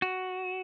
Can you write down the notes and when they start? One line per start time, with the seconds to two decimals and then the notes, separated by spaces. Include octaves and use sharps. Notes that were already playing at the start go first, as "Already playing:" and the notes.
0.02 F#4